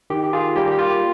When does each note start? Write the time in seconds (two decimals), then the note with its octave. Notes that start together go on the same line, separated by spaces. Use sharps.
0.10 D#3 G4
0.24 G4
0.33 F4 G#4
0.56 G3 A#3 G4
0.71 G4
0.79 F4